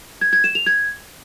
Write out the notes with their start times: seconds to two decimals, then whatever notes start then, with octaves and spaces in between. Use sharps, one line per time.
0.21 G#6
0.33 G#6
0.44 E7
0.55 F7
0.66 G#6